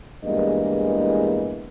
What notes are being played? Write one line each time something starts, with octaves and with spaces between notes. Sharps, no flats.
E2 G2 E3 G#3 A#3 D#5